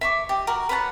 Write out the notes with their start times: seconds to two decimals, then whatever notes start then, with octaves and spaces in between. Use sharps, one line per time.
0.01 E5 C#6 D6
0.29 G4 D#5
0.47 F#4 A#4
0.69 B4 C#5 F#5 A5